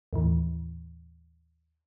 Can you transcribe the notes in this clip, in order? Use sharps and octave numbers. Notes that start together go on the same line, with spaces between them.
D#2 A2 E3